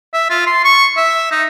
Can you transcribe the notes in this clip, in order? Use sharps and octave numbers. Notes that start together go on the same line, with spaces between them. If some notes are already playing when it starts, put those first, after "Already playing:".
E5
F4
C6
C#6
E5
D#4